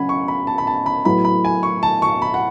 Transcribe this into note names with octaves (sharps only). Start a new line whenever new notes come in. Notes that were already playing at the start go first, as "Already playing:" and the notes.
Already playing: C#3 F#3 C#4 F#5 G#5 B5
C#6
B5
A5
B5
A5
B5
A2 F#3 B3 E4 B5
B5
G#5
C#6
A5
C#6
B5
F#5